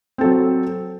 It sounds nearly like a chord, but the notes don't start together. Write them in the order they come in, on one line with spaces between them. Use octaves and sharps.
C4 A4 F#3